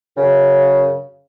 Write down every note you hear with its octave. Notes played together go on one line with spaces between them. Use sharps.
F#2 C#3